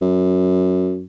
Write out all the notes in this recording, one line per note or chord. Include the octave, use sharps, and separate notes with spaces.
F#2